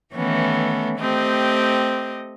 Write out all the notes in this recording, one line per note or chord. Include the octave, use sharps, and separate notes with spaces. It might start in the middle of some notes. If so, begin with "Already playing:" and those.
D#3 E3 A3 B3 C#4
A3 C4 G4 D#5